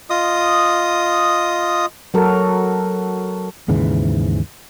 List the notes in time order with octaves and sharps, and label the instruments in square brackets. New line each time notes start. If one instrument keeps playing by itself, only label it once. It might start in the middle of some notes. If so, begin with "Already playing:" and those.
[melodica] F4 D#5 D#6
[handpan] F#3 F#4 A4 A#4
[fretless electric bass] D#2 G#2 C#3 E3